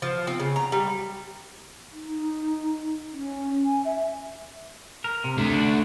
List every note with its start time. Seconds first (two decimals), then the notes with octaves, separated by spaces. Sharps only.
0.02 F3
0.27 C4
0.40 C#3
0.56 A#5
0.72 G3
1.92 D#4
3.13 C#4
3.64 G#5
3.85 E5
5.04 A#4
5.24 C3
5.38 D3 A3
5.54 D4 F#4